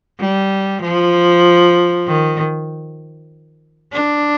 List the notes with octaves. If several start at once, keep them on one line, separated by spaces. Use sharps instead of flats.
G3
F3
D#3
D4